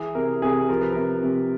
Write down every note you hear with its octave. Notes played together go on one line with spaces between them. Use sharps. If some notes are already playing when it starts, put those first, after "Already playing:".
Already playing: E3 G#4
C3 A#4
C3 G#4
F3 A#4
B4
C3 A#4
C3